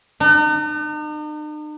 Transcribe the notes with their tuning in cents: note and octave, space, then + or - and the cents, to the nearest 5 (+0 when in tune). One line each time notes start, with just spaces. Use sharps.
D#4 -45